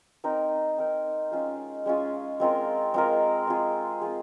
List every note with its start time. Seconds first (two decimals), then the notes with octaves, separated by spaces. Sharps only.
0.24 C4 D#4 A#4
0.78 C4 D#4 A#4
1.31 G#3 C#4 F4 G#4
1.86 G#3 C#4 F4 G#4
2.40 G#3 C4 F4 A#4
2.94 G#3 C4 F4 A#4
3.47 C4 F4 G#4
4.02 C4 F4 G#4